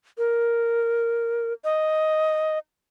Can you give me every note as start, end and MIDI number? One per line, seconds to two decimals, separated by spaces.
0.18 1.53 70
1.64 2.59 75